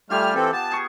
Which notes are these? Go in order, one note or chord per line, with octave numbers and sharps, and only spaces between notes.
G3 A3 F4 G4 G#5 F6
E3 C4 A4
B3 A5
G#4 C#6